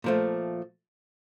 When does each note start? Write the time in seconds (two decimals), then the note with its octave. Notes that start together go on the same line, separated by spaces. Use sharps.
0.04 A#2 F3 A3